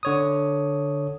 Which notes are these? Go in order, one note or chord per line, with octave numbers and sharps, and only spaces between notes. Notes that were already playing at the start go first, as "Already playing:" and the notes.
D3 C#5 D#6